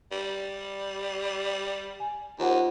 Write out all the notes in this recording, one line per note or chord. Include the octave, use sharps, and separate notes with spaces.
G3
G#5
D#2 F4 C5 F#5